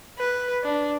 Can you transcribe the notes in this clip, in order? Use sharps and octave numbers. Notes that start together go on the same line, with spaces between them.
B4
D4